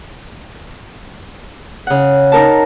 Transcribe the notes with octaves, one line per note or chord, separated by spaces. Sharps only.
C#3 F#5
D#4 A#4 A5